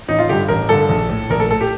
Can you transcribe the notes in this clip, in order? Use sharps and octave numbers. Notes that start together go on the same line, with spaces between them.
A1 D#4
F4
G2 D3 G4
A1 A#4
G2 D3 A4
A#1
A2
A#1 A#4
A4
A2 A4
G4